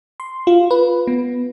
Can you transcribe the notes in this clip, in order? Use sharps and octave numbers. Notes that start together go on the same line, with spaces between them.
C6
F4
B4
B3